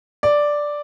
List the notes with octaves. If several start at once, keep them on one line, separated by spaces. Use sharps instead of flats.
D5